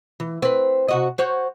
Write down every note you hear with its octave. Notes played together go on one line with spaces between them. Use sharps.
E3
C4 B4
C3 F#4 D#5
F#4 C5 C#5